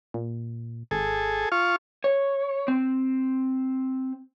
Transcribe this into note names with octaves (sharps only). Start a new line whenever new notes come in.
A#2
G#1 G#4 A4
F4 F5 C#6
C#5
C4